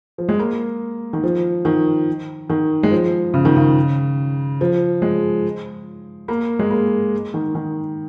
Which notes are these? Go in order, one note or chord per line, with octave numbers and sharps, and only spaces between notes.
F3
G#3
A#3
D#3
F3
D#3
D#3
G#3
F3
C#3
D#3
C#3
F3
G#3
A#3
G#3
A#3
D#3
D#3